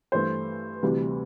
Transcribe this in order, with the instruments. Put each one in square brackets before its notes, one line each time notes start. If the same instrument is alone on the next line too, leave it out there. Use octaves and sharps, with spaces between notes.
[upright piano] G2 E3 A3 C5
D2 C3 E3 G3